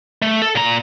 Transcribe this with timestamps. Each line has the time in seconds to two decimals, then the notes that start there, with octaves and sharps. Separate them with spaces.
0.22 A3
0.42 A4
0.55 A#2 A#5